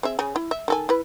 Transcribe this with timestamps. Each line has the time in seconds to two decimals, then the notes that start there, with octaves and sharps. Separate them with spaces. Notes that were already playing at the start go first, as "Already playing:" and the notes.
0.03 C4 G#4 E5
0.19 C#3 G#5
0.36 E4
0.51 E5
0.68 D#3 A4 G#5
0.89 E4 B4